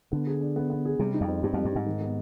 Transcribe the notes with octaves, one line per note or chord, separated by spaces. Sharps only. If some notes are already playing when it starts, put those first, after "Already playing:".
D3 B3
G#4
D4
B3
B3
G#4
C3 G3
D#4
F2
C4
G2 G4
F2 G3
G2
G#2 D#4
D#3
B3